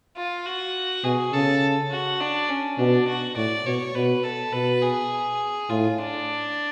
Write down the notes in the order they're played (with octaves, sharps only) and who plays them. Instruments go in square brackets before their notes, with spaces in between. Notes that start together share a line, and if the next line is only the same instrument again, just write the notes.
[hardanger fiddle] F4
F#4
[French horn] B2 [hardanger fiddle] G#4
[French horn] C#3 [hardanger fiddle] A4
[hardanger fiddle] F#4
D4
C#4
[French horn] B2 [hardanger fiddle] D4
[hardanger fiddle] F#4
[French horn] A2 [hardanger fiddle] D5
[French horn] B2 [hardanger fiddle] C#5
[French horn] B2 [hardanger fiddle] B4
[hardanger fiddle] A4
[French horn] B2 [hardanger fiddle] B4
[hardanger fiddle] G#4
[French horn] A2 [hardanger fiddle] F4
[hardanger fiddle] D4